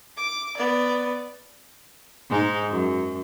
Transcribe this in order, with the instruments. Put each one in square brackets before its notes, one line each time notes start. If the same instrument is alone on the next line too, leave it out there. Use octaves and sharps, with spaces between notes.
[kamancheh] D6
B3 D5
[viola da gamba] G#2 G#3 D#4
F#2